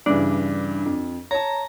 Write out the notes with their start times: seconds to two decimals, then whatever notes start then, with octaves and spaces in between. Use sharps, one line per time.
0.06 G2 C#3 E3 D4
0.86 F2
1.31 C#5 A5 A#5